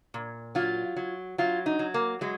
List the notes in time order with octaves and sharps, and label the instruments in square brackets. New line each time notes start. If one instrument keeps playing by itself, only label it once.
[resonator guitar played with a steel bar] A#2
F#3 F4
F#3
F#3 F4
D#4
F#3
A#3
F#3 G#3